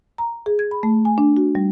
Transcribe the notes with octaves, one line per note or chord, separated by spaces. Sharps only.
A#5
G#4
G#6
B5
A3
G#5
D4
F#4
G3